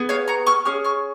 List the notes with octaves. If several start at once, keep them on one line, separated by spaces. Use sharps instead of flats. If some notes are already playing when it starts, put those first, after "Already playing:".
Already playing: B3 G#4
C#5 F5
A#5 C#6
C#6 F6
C#4 G#4 C#6 F6
C#6 F6